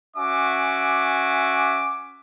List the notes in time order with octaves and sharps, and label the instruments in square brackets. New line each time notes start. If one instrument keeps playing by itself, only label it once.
[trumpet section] C#4 F#4 E5 G#5 D6